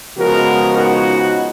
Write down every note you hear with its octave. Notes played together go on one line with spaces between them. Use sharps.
C#3 F3 G#3 B3 F#4 A#4
D#4 F#4